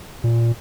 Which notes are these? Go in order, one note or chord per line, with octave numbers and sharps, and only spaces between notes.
A#2